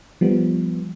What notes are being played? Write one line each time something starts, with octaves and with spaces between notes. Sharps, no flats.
F3 G3 B3